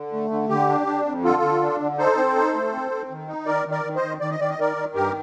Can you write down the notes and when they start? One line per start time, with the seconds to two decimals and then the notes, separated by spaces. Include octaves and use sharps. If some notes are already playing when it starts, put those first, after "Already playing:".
Already playing: D3
0.13 A3
0.30 D3
0.49 D3 G4
0.69 D4
0.87 D4
1.05 F2
1.23 D3 F4 A4
1.42 D3
1.61 D4
1.80 D3
1.98 D#4 A4 C5
2.17 C4
2.36 D#4
2.54 A3
2.72 C4
2.91 C4
3.10 D#3
3.28 D#4
3.46 D#3 A#4 D5
3.66 D#3
3.71 A#4 D5
3.84 D#3
3.95 C5 D#5
4.02 D#3
4.21 D#3 D5
4.31 D#5
4.40 D#3 D5
4.50 D#5
4.58 D#3 A#4 D5
4.76 D#3
4.95 G2 G4 A#4